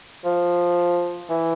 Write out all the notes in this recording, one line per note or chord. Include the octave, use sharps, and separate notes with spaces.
F3
E3